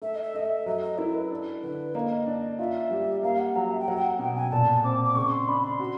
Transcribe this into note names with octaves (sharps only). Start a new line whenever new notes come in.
A3 E5
D#5
E5
A3 D#5
E5
F#3 D#5
D#5
E4 A#4
B4
D4
D3 B4
A#3 D#5
D4
F4 E5
G3
A#3 F5
F#5
F#3 A#5
E5
G5
F#3 F#5
G5
F#5
B2 G5
G#5
A#2 A5
C4 D6
D6
C#3 C#6
C6
D4 B5
C6
F#4